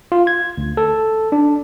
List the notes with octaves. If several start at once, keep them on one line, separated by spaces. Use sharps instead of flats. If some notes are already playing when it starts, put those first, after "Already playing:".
F4
G#6
D2
A4
D4